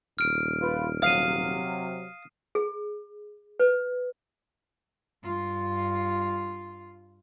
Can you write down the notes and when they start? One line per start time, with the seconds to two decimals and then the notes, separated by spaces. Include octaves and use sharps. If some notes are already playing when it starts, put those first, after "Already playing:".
0.19 D#1 F6 D7
0.61 F4 B4
1.02 C3 F#3 F5 D#6 C7 D#7
2.55 G#4
3.60 B4
5.22 G2 F4